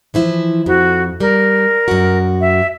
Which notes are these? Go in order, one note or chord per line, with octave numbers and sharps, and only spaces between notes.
E3 F3 E4
F2 F#4
G3 A#4
F#2 F#4
E5